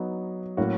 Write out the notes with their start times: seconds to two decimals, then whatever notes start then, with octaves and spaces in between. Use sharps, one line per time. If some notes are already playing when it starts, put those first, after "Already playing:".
Already playing: F#3 B3 D#4
0.57 A2 F#3 A#3 C#4 F#4